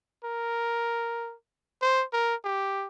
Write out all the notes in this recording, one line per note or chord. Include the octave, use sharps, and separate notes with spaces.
A#4
C5
A#4
G4